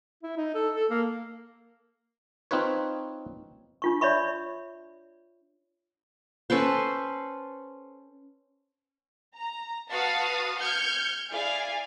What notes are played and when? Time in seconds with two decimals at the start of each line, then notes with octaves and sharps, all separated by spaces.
0.23 E4
0.36 D#4
0.54 A4
0.76 A4
0.90 A#3
2.51 C4 D#4 F4 B4 C#5
3.82 D4 F4 C#6
4.01 C#5 D5 E5 B5 C#6
6.50 C#4 A4 B4 C5
9.36 A#5
9.90 F#4 B4 F5 A5 D#6
10.60 F6 G6 G#6 C#7
11.32 E4 G#4 D5 F5 G#5